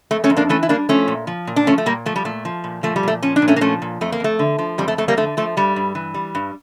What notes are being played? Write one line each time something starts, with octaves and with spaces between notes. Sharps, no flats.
F2 A3
A3 C#4
F2
A#3 D4
E3 A3 C#4
E4
G3 A#3 D4
F3 A3 C#4
A#2
F3
A#2
D4
F3 A3 C#4
A3
A#2 G3 A#3
F3 A3
G3
A#2 A3
F3
A#2
F3 A3
G3
A#2 A3
F3 C#4
D4
A#2
A3 C#4
A#3
F3 A3 C#4
A#2
F2 A3
A#3
F2 A3
D3
F3
F2 G3
A3
F2 A3
G3 A#3
D3 A3
F3 A3
G2 G3
G2
E3
G3
G2